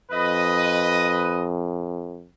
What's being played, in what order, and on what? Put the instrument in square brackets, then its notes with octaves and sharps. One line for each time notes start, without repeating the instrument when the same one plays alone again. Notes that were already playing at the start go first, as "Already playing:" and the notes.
[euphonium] F2 [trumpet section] B4 D#5